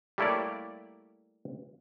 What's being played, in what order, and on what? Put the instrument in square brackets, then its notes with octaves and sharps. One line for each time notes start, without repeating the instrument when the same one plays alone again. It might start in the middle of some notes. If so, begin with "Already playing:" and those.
[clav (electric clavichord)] G3 A3 A#3 E4 C#5 D5